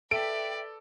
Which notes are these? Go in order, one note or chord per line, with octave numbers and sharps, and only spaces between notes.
A4 B4 D5 E5 G5 D7